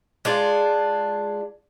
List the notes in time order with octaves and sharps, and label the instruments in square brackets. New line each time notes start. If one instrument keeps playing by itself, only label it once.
[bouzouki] G#3 D4 F4